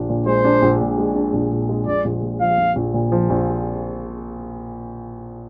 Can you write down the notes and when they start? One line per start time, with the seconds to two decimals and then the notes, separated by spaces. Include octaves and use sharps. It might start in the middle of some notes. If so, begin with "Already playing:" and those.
Already playing: A#1 D4
0.09 A#2
0.26 G#3 C5
0.45 D4
0.62 A#1
0.80 A#2
0.98 G#3
1.15 D4
1.33 A#1
1.52 A#2
1.69 G#3
1.87 A#1 D5
2.05 A#1
2.22 A#2
2.40 F3 F5
2.58 A#1
2.76 A#1
2.94 A#2
3.12 F3
3.30 A#1